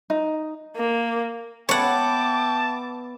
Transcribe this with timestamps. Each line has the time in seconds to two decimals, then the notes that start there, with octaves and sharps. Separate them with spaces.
0.10 D#4
0.76 A#3
1.69 B3 C#5 E5 F#5 G5 A5 D6